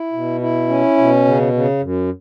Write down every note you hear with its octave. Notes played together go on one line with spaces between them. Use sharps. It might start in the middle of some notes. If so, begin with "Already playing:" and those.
Already playing: E4
B2
E4
C#4
B2
C#3
C#3
F#2